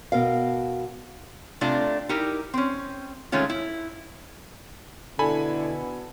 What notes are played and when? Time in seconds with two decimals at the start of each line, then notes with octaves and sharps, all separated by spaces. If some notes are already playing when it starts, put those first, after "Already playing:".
0.12 B2 A#4 F5
1.61 C3 A3 D4 F4
2.09 D#4 E4 G4 A#4
2.54 C4 C#4
3.32 D#3 G#3 A3 C#4 F4
3.50 E4
5.19 B2 D3 B3 E4 A4 G#5 B5